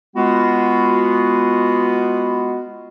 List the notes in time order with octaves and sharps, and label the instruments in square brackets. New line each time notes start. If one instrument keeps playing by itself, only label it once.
[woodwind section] G#3 B3 F4 F#4